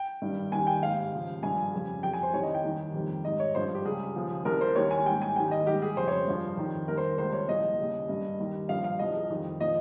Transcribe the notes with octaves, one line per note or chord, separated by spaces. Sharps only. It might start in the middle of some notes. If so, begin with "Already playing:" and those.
Already playing: G5
G2 D#3 G3
D#2 D#3 G3 G#5
G5
G#2 G3 F5
D#2 C#3 F3
G2 F3 G#5
F2 C#3 G3
F2 C3 G3 G5
G#5
C5
C2 C3 D#3 G3 C#5
D#5
G5
D#2 D#3 G3
F2 C3 D#3 G3
G#2 G3 D#5
C#5
G2 F3 C5
G4
C#2 C#3 G3 G#4
D#2 C#3 F3
C2 C3 G3 A#4
C5
D#2 D#3 G3 C#5
G#5
G#2 G3 G5
G#5
D#2 D#3 G3 G5
D#5
G#2 G3 G4
G#4
F2 C#3 G3 C5
C#5
C5
G2 F3
F2 D#3 G3
D#2 D#3 G3 A#4
C5
C#2 C3 G3 C5
C#5
C2 A#2 F3 D#5
D#2 C#3 G3
G2 G3
D#2 D#3 G3
G2 F3 F5
F5
C2 C3 F3 D#5
G#4
F2 D#3 G3
A#2 F3 D#5